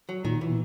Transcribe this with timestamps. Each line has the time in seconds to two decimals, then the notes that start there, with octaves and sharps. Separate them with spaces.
0.09 F#3
0.25 A#2 D#3
0.36 B2
0.41 E3
0.49 A#2